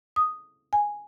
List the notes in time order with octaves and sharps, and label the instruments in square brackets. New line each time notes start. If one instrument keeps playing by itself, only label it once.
[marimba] D#6
G#5